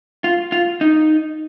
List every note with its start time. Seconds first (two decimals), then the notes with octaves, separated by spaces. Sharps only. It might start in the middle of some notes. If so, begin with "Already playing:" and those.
0.24 F4
0.52 F4
0.81 D#4